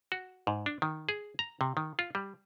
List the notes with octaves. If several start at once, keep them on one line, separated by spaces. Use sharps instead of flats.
F#4
G#2
D4
D#3
G#4
A#5
C3
D#3
F4
G3